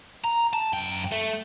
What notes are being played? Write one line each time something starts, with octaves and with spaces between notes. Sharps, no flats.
A#5
A5
F#2 G5
A3